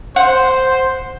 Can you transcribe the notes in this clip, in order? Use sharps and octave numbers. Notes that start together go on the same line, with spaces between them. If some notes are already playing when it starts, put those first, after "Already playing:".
C5 F#5